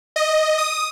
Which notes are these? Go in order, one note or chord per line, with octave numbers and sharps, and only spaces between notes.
D#5
D#6